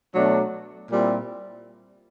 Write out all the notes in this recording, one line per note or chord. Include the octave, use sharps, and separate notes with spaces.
B2 F#3 A3 D4
A#2 G3 C4 E4